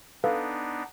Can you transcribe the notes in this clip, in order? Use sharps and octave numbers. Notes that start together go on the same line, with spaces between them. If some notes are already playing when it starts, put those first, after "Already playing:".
B3 D4 D#4 A4 B4 F5